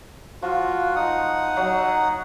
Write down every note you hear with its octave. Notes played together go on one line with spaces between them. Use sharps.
F3 F4 F#4
D#4 F#5 D#6
F#3